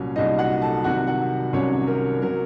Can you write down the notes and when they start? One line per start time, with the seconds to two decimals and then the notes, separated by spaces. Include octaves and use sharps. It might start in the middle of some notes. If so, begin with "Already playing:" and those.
Already playing: C2 A#2 F#3 C#4
0.16 C2 A#2 F#3 D#4 D#5
0.38 F#4 F#5
0.62 A4 A5
0.84 C2 C3 D#3 F#3 F#4 F#5
1.07 F#4 F#5
1.53 C2 C3 D#3 F#3 C#4 C#5
1.87 A#4
2.22 C3 F#3 A#4